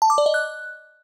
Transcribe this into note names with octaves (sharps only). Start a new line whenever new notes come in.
A5
D6
D5
D#5
F#6